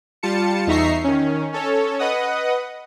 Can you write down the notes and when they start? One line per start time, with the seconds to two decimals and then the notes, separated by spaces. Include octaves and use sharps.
0.23 G3 F4 A5 C#7
0.67 E2 D#4 E5 A#5 C#6 C7
1.04 D#3 C#4
1.52 C#4 A4 C#5
1.99 B4 D#5 F#5 D#6